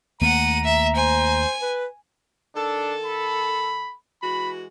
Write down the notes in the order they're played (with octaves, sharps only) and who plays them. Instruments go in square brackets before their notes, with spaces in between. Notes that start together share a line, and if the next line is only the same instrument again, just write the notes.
[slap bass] D#2 A3 A#3 [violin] F#5 D#7 [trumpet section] A#5
[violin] E5
[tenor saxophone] C5 [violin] G#5
[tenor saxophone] B4
[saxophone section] D#3 A4 [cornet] D4
[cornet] B5
[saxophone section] E3 G#3 F#4 [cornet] B5